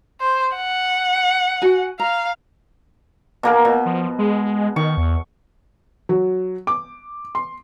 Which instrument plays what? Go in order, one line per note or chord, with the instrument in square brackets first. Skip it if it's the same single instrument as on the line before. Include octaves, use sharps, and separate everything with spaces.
[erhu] C5
F#5
[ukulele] F#4 G#5
[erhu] F5 [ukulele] A#5
[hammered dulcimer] B2 A#3 A#4
B2
[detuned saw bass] F3
G#3
[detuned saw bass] D#3 [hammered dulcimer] C#6
[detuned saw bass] E2
[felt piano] F#3
D6
C6